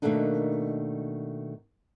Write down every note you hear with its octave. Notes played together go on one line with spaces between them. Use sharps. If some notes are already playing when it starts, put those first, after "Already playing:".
B2 D#3 A3 A#3 D4 D#4